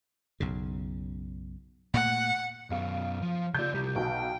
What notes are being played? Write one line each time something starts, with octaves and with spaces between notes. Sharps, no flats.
B1 F#2 C#3
A#2 A3 F#5
F#2 B2 F5
F3
C#3 F3 D5 G6
C2 G4
B1 B2 G5